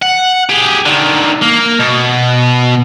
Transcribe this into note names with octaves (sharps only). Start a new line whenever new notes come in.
F#5
G4 G#4
D3 D#3
A#3
B2